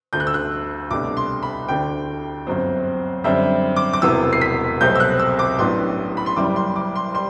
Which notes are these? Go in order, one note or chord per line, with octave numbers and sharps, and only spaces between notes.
D2 D3 A3 G6
F#6
E6
F#6
C2 B2 A3 D4 D6
C6
B5
D2 D3 A3 D4 G5
G1 F#2 F#3 C4
F#2 D3 G3 C4 E5
D6
D6
E1 E2 C3 E3 B3 E6
C7
B6
C2 B2 F#3 A3 C4 G6
E6
F#6
E6
D6
A1 A2 F#3 B3 D4 C6
B5
C6
F#1 F#2 E3 G3 D6
C6
D6
C6
G3 C6